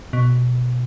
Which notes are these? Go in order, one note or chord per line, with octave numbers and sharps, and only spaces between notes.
B2